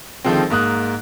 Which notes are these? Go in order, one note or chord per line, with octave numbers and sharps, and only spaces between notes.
D3 D#3 F3 G#3 C4
G#2 A#3 D#6 F#6